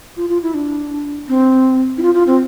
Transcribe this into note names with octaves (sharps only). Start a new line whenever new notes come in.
F4
F4
E4
D4
C4
E4
F4
F4
C4